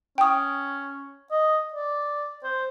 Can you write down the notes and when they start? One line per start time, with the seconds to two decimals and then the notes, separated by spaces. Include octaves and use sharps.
0.18 C#4 G5 D#6
1.31 D#5
1.74 D5
2.43 C5